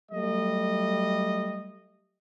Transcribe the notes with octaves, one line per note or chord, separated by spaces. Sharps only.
F#3 G3 A3 D#5